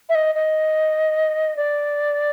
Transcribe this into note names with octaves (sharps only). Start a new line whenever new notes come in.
E5
D#5
D#5
D5